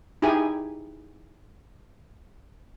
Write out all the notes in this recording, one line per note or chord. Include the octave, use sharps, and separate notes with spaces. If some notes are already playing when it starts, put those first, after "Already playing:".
D#4 E4 G4 G#4 G#5